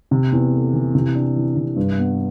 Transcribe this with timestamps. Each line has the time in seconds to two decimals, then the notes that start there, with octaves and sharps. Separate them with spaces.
0.11 C3
0.32 E2
0.53 A3
0.73 E3
0.95 C3
1.15 D4
1.36 E3
1.56 C3
1.76 G2
1.98 B3